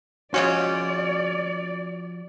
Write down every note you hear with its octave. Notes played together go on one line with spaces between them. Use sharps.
C#3 F3 G#3 C#4 F#4 D5